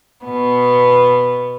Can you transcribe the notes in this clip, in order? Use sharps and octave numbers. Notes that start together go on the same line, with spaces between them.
B2 B3